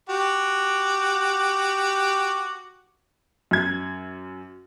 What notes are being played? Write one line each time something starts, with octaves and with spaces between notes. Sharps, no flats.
F#4 G4 D6
F#2 G#6